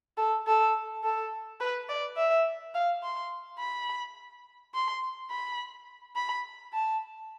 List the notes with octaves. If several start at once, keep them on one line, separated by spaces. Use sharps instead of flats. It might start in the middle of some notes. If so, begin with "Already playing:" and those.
A4
A4
A4
B4
D5
E5
F5
C6
B5
C6
B5
B5
A5